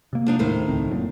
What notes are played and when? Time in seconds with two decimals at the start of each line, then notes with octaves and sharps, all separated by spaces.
0.13 C3 A#3
0.26 F3 D4 D#4
0.39 D#1 A2 D#3 C5
0.68 C#2 C4
0.91 G1 F#2 A#2